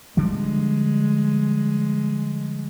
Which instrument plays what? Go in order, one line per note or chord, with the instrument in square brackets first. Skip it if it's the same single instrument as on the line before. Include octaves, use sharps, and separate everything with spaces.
[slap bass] D3 F3 G3 [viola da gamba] G#3